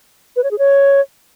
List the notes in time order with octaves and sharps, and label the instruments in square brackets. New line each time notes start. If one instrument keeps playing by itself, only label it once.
[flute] B4
C#5
G#4
C#5